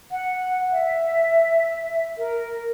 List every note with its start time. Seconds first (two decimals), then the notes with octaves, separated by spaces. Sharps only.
0.11 F#5
0.72 E5
2.18 A#4